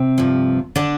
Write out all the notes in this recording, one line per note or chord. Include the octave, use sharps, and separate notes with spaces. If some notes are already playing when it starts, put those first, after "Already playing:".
Already playing: C3 C4
G2 F3
D3 D4